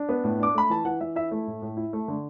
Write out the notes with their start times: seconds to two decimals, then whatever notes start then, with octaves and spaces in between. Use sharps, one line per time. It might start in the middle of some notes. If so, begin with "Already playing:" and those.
Already playing: D4
0.09 B3
0.24 A2
0.39 D4 D6
0.54 A3 B5
0.70 E3 A5
0.85 E3 F#5
1.01 E3 E5
1.16 E4 E5
1.31 A3
1.47 A2
1.62 A2
1.77 E4
1.93 A3
2.08 D3